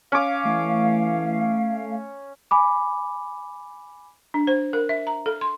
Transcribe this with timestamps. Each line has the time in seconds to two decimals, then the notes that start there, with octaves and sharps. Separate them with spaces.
0.12 C#4 F5 D6
0.45 E3 A3
2.51 G#5 B5 D6
4.34 D4
4.47 C5
4.73 A#4
4.89 E5
5.07 A#5
5.26 A4
5.41 C6